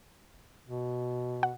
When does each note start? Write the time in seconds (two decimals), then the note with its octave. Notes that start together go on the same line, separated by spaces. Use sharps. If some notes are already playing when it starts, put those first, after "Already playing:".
0.67 B2
1.43 F#5